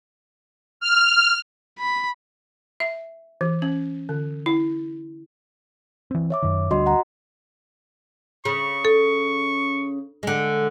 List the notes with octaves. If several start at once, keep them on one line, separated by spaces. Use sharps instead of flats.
F6
B5
E5
E3
C#4
D3
E4
E3 C4
C#5 E5 D6
F#2 D#3
D2 G3 D4 F#4 D#5 C6
F#5 A#5
C#3 C#6
A4
D3 G#3